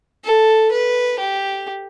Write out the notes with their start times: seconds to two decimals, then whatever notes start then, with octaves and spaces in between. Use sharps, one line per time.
0.25 A4
0.72 B4
1.19 G4